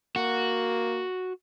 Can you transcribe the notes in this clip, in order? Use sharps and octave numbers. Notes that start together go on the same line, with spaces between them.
A#3 F#4